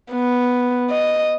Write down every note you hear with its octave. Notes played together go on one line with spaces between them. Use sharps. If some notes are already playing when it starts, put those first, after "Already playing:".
B3
D#5